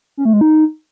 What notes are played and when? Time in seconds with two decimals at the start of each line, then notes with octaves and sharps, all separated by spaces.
0.17 C#4
0.25 A3
0.33 G#3
0.41 D#4